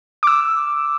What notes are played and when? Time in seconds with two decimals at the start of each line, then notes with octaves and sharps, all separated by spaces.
0.23 D6 E6